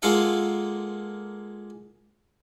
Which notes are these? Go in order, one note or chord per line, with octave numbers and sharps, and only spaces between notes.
G#3 A#3 F4 A4 F5 F#5